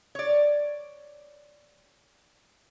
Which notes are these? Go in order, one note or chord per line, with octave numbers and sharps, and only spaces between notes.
C#5 D5